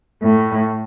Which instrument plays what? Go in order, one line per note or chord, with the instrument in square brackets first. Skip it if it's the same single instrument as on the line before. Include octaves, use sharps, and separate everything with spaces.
[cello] A2